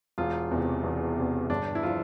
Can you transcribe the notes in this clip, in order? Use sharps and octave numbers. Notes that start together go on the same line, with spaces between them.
E1 F4
E2 C3
E1
E2 C3
G1 D4
E4
F3 F4